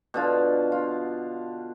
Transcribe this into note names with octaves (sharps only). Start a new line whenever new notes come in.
B2 D3 F4
F4